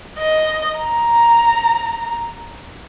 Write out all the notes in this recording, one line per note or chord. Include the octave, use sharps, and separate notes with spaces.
D#5
A#5